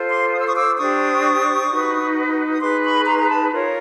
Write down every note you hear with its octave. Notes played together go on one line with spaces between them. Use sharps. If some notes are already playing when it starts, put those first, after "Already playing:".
Already playing: F4 A4 C5
C6 D6
D#6
E6
C#6 D#6
D6 E6
D4 G4 C5 C#6 D#6
D#4 F#4 B4
D#6
D#4 G#4 B4 C6 D6
B5 C#6
A#5 C6
A#5
A5 B5
F4 A#4 C#5